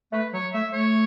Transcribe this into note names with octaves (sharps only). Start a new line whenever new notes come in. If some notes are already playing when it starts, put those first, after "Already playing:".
A3 B4
F#3 C#5
A3 E5
A3 C#5